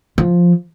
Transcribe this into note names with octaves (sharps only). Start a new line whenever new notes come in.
F3